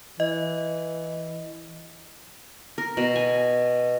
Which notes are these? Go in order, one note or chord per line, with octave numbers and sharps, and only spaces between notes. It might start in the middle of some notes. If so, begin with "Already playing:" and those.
E3 D#5
A#4
B2
G#5